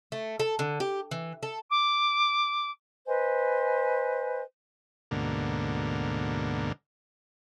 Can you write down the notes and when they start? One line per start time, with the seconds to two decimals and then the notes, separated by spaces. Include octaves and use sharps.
0.12 A3
0.40 A4
0.59 D3
0.80 G4
1.11 E3
1.43 A4
1.70 D6
3.07 B4 C5 D#5 G#5
5.11 D2 G#2 B2 D3 A#3